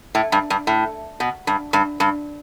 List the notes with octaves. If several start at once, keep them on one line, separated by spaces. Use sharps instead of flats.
A2
G2
G2
A2
B2
G2
G2
G2